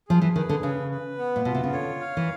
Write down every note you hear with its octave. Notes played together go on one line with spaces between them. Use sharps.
F3 G#4
E3
D#3 B4
D3
C#3 B4
B4
B3
A#2
B2 F4
C3
C#3
D3 C#5
F5
E3